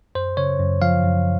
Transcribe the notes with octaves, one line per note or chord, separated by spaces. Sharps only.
F#2 C5
C#3 C#5
F#2
F3 F5
F#2